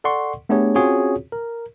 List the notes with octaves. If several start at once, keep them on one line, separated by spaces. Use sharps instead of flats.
A4 D5 F#5 C6 C#6
A3 B3 D4 G4 G#4 C#5
C4 C#4 F4 F#4 G#4 C#5
A#4